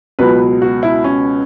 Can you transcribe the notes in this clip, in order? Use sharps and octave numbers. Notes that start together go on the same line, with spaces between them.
C#2 B2 F#3 B4
F#4
E4
C#4